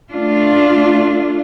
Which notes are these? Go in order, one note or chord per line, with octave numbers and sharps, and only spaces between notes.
A3 D4 F4